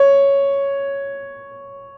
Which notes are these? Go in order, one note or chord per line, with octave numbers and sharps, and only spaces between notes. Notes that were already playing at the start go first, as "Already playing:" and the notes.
Already playing: C#5